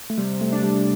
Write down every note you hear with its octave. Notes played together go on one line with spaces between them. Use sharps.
A3
C3 G3
A3
D4
G3